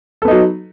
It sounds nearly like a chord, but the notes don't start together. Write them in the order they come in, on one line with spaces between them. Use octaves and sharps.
A4 B3 D#4 F#3